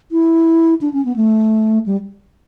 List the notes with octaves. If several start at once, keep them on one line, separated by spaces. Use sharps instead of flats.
E4
D4
C#4
B3
A3
G3